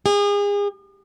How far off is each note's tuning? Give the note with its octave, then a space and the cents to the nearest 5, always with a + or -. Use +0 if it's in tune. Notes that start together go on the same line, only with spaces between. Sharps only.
G#4 -35